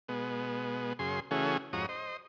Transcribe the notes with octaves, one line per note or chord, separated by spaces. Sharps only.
B2 G#3 B3
F#2 C#3 G#4 C6
C#3 E3 A3 C#4 F#4 G#4
F2 G#2 F#4 C#5 A#5 D#6
C5 D#5